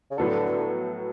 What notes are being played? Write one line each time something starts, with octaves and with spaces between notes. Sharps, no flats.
C#3
A2 D3 F#3 B3 F#4 A4